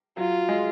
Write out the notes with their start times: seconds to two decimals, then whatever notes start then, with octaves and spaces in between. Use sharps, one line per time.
0.17 F#3 F4
0.49 G#3